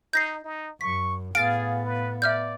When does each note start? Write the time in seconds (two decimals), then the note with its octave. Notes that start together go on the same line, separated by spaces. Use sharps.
0.13 D#4 G6 A#6 C7
0.44 D#4
0.81 F#2 C#6 B6
1.35 A2 B3 G#4 F5 A6 D7
1.85 B4
2.22 D5 E5 F6 G6